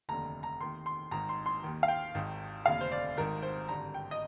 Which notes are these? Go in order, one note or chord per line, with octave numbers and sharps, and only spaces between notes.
F1 D#2 D3 A#5
A#5
D#2 D#3 C6
C6
G#1 G#2 D#3 A#5
C6
C6
D#2 D#3
F5
G5
G#1 G#2 D#3
F1 D#2 D3 F5
C5
D5
G#1 G#2 D#3 A#4
C5
G#1 G2 D3 A#5
G5
D#5